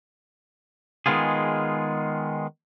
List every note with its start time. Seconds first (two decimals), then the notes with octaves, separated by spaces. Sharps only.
1.06 D#3 G#3 B3 F4 G#4